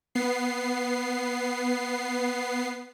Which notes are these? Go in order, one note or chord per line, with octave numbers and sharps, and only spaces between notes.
B3 C7